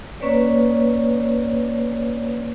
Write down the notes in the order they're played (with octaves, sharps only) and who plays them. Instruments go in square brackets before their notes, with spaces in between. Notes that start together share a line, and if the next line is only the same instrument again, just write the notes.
[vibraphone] A#3 C#4 B4 C#5 D5